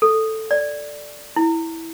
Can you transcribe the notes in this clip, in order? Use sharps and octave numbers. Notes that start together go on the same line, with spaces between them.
A4
D5
E4